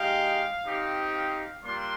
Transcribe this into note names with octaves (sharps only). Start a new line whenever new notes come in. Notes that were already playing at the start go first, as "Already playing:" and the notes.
Already playing: G#3 D#4 G4 F5
C4 D#4 G4
F5
G3 A#3 D4 F4 C6